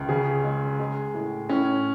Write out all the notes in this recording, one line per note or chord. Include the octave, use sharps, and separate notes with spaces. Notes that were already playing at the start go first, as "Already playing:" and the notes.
Already playing: C#2
C#3 G#4
G#3
G#3
A2
A2 C#4